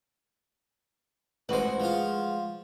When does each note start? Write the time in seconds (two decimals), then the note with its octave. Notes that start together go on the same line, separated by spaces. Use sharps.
1.49 A1 G#3 F#4 B4 C5
1.80 F3 F4